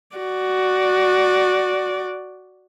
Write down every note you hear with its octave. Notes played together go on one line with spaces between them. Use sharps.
F#4 D5